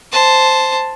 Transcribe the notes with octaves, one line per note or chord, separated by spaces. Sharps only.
C5 A5